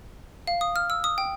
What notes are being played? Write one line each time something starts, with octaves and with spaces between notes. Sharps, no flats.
F5
D#6
F6
E6
D#6
G5